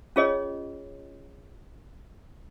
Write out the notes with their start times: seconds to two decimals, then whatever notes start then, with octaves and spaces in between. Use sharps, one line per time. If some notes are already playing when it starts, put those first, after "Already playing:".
0.16 C#4 F4 G#4 C#5 D#5